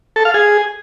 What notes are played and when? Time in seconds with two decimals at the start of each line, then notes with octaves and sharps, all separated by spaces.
0.16 A4
0.25 F5
0.34 G#4